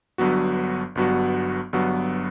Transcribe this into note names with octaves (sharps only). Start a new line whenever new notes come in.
G1 G2 F#3 B3 F#4
G1 G2 F#3 B3 F#4
G1 G2 F#3 B3 F#4